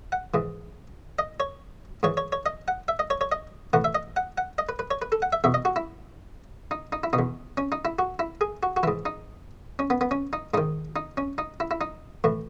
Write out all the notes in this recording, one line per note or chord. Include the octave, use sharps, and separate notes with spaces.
F#5
G#2 E3
D#5
C#5
G#2 E3 C#5
C#5
C#5
D#5
F#5
E5
D#5
C#5
C#5
D#5
A2 E3 F#5
E5
D#5
F#5
F#5
D#5
B4
B4
C#5
B4
A4
F#5
E5
E2 B2 E5
D#5
F#4
E4
D#4
D#4
E4
B2 D#4
E2
C#4
D#4
E4
F#4
E4
G#4
F#4
F#4
G#2 E3 E4
D#4
C#4
B3
B3
C#4
D#4
G#2 D#3 D#4
D#4
C#4
D#4
E4
E4
D#4
A2 E3